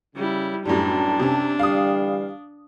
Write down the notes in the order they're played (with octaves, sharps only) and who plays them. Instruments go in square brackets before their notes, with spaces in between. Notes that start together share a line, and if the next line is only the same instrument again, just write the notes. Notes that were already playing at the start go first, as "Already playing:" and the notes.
[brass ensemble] C#3 [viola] G3 E4
[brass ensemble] B1 G5 A5 [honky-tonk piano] F#2 A2 G3 [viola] D4
[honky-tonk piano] C3 C#4
[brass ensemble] D3 E3 G3 [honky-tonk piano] F5 D#6